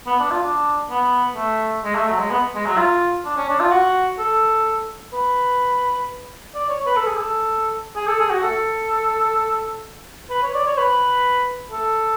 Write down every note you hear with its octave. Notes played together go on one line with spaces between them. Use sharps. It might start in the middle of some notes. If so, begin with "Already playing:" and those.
B3
D4
F4
D4
B3
A3
G#3
A3
F#3
G#3
B3
G#3
F#3
F4
D4
C#4
D4
F4
F#4
A4
B4
D5
C#5
B4
A4
G#4
A4
G#4
A4
G#4
F#4
A4
B4
C#5
D5
C#5
B4
A4